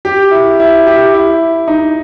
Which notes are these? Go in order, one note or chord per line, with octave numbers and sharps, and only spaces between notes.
G4
E4
E4
G4
E4
D#4